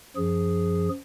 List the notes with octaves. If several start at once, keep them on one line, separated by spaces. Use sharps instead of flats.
F#2 F3 G#4